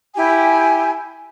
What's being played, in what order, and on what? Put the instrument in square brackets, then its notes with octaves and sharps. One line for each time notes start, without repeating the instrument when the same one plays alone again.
[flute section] E4 G4 G#5